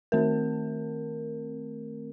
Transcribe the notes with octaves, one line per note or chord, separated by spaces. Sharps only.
D#3 A3 C4 A#4